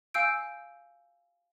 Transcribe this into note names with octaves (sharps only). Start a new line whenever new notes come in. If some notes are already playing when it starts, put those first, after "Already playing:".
F5 G#5 E6 G6 D7